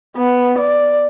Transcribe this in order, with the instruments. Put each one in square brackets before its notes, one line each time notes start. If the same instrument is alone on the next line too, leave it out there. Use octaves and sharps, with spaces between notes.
[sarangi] B3
D5